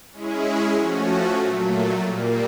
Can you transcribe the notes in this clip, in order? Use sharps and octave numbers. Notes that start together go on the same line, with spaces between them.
G#3 C#4 E4 G#4
F3 A3 C#4 F#4
A#2 F#3 A3
A#2 G3 A#3